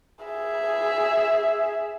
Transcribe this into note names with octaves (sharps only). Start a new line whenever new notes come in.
G#4 E5